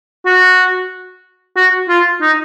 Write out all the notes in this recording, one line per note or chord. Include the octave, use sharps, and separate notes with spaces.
F#4
F#4
F4
D#4